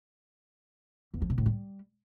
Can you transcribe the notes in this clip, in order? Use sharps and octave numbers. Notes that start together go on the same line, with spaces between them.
E2
F3
B2
A2
G3